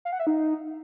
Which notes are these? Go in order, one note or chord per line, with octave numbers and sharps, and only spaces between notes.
F5
F#5
E5
D#4